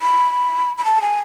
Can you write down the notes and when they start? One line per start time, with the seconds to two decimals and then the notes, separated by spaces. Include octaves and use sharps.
0.02 B5
0.78 B5
0.85 A5
1.02 G#5